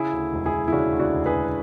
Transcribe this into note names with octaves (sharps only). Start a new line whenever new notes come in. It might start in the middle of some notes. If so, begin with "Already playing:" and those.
Already playing: C#3 E4 G#4
D2
E1
E4 G#4
E1
E4
C#3 D4 F#4
D2
D4 F#4
E1
G#4 B4
E1